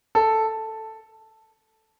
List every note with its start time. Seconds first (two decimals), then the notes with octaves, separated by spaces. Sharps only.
0.15 A4